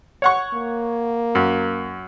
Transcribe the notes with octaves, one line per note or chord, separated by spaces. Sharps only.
C#5 F#5 C#6
A#3
F#2